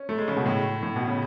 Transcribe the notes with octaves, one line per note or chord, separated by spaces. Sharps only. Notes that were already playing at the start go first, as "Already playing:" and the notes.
Already playing: C#4
A3
G#3
C#3
B2
A2
A2
B2
C#3